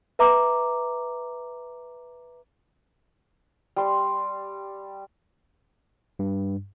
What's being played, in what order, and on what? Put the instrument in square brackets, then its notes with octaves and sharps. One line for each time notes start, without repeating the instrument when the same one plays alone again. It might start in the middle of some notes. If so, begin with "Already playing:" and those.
[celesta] B4 E5 A#5 D6
[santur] G3 C6
[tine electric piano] G2